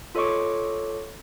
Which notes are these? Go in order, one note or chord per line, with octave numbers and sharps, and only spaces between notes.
F4 A4 C#5 D#5 C#6 D6